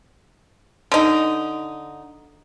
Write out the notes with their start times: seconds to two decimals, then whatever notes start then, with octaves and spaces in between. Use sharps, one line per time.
0.92 D3 D#4